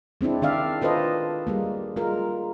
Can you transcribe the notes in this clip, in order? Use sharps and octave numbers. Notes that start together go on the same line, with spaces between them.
G#3 C4 D4 E4
D#3 D4 D5 E5 F5
F4 A4 B4 C5 D#5
G3 G#3 A#3
G#3 F4 A#4